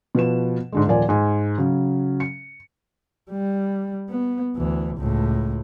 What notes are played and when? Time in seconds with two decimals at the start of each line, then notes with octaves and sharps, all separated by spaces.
0.15 B2 F3 B4 E7
0.72 G#2 D3 G#3
0.87 D#1 F3 A#3 D5 G#5
1.09 G#2 G#5
1.58 C#3 F#3
2.20 C#7
3.31 G3
4.09 B3
4.56 D2 E3
4.97 C#2 A2